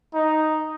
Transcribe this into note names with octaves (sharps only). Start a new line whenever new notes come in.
D#4